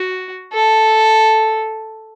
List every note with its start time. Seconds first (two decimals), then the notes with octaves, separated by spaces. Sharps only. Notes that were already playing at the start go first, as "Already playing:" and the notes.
Already playing: F#4
0.53 A4